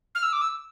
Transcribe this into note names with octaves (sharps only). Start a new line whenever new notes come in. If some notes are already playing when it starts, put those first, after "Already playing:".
F6
E6
D6
E6